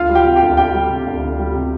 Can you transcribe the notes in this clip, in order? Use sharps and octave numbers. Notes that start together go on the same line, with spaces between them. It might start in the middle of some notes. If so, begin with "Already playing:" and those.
Already playing: D2 F4 F5
G3
G4 G5
C3
G4 G5
D2
D2 G4 G5
G3
C3
D2
D2
G3
C3